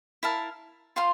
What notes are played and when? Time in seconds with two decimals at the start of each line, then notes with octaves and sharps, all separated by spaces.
0.23 E4 A#4 F5 A5
0.96 F4 C5 F5 C6